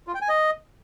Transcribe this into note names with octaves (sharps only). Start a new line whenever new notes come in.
F4
G5
G#5
D#5